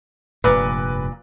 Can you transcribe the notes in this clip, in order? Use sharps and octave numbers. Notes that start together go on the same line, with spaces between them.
F1 G2 A#2 B4